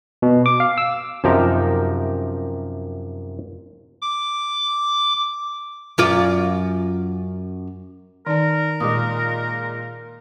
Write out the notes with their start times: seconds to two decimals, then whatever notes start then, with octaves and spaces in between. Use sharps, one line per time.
0.22 B2
0.46 D6
0.60 F5
0.78 E6
1.24 F#2 C3 F3 D#4 G4 A#4
4.02 D6
5.98 F#2 F4 D5
8.27 D#3 D#4 A#4 D5 A5
8.80 A#2 G#3 D6 D#6